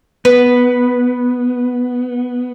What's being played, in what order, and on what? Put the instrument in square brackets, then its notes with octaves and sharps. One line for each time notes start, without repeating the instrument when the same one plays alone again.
[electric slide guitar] B3 [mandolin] B4